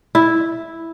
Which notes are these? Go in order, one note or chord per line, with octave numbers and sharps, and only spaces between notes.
E4